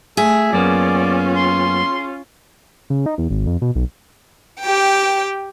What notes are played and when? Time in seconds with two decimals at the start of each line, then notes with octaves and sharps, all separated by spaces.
0.17 A3 G#4 E5
0.53 F#2 A#3 B3 C#4 F4 D5
1.36 C6
2.90 C#3
3.06 D#4
3.18 E2
3.30 G#1
3.47 F2
3.62 B2
3.75 B1
4.61 G4 G5